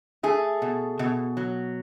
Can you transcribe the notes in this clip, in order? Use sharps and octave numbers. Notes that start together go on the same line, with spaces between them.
A3 G#4
B2
B2
F#3